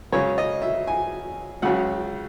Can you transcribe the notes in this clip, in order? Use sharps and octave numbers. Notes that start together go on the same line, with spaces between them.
F#2 C#3 G#3 C#4 C#5
D#5
E5
G#5
C#2 C#3 F#3 F#5